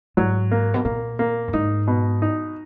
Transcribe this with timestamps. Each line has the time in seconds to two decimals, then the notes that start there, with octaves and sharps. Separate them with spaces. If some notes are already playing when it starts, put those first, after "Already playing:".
0.17 G#2 F#3
0.51 A#3
0.74 B2
0.85 A#2 A#3
1.19 A#3
1.48 F#2
1.53 G#2 D#4
1.87 B2
2.22 D#4